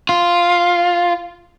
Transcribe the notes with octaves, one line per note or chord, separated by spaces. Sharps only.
F4